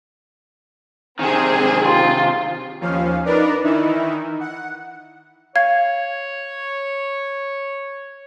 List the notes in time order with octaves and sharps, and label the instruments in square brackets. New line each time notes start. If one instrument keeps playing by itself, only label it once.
[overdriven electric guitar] C3 D#3 [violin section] C4 G#4
[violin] F4 [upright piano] G4 C6
[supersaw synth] D#2 F3 C#4 F5
D4 D#4 A#4 B4 D5
D#3 E3 D#4 E4
F#5
[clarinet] C#5 [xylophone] F5 G#6